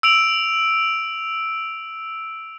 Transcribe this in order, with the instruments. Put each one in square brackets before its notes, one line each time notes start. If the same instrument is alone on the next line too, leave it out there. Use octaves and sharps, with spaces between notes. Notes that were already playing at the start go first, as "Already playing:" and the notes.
[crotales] E6 D7 F7